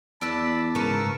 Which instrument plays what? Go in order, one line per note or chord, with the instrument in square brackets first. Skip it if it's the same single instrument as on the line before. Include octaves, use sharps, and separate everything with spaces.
[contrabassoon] E2 [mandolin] D5 E6 F#6 [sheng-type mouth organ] A5 B5
[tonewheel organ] G#2 C#3 A#4 [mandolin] B4 A#5 E6 [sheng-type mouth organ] A5 C#6